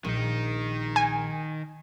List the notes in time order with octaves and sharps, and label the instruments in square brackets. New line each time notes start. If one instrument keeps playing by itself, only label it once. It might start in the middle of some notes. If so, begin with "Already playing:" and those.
[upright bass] A#1 [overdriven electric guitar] D#3 D#4
[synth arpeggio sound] G#5